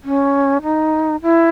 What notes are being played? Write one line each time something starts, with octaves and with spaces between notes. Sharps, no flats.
C#4
D#4
E4